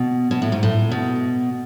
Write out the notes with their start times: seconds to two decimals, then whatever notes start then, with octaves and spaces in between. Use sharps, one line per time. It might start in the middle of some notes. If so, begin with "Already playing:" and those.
Already playing: B2
0.31 B2
0.42 A2
0.52 G#2
0.63 A2
0.91 B2